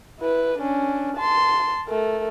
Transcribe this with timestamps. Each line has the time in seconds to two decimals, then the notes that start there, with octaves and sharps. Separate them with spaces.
0.19 E4 B4
0.58 C#4 D4
1.17 A5 C6
1.87 A3 A#4